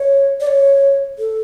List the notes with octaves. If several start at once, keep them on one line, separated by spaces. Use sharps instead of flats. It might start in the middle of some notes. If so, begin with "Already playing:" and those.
Already playing: C#5
D5
C#5
A4